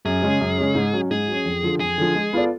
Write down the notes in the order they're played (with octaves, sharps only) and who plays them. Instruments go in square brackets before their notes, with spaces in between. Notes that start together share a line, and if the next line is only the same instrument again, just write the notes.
[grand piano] F#2 [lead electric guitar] G#4
[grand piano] C#3 G#3 C#4
F#2
C#3 G#3 C#4
G#2
F#3 C#4
[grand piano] G#2 [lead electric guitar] G#4
[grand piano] F#3 C#4
F2
D3 F3
[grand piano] F2 [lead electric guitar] G#4
[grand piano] D3 F3
G#3
B3 F4 A4 D5